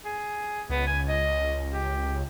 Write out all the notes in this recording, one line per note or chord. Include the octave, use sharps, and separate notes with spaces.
G#4
C#2 B3
G#5
D#5
G4